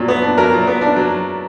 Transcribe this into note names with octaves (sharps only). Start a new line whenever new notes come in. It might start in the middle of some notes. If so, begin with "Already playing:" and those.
Already playing: A#2 F#3
B3
D4
F#3 A#4
A#2
B3
D4
F#3